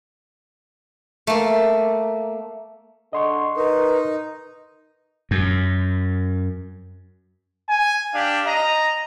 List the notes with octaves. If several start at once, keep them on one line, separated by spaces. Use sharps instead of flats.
A3 A#3
D3 D#5 C6 C#6
D#4 A#4 B4
F#2
G#5
D4 G4 F5
D#5 A#5